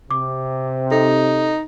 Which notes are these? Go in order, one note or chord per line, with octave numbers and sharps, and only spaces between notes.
C3 D6
D#4 A4